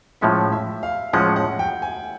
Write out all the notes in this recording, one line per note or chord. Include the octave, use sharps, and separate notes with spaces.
A2 F3 G#3 C#4 E5
E5
F5
A2 F3 G#3 C#4 F#5
F#5
G5
G#5